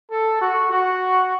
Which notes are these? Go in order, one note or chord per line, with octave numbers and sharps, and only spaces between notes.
A4
F#4
F#4